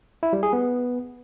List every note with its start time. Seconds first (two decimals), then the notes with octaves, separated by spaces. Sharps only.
0.23 E4
0.33 G3
0.43 G#4
0.53 B3